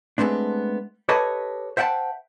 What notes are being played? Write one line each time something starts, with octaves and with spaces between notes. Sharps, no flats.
G#3 A3 B3 C4 D4
G4 A4 B4 C#5 D#5 A5
C5 E5 F#5 G5 A5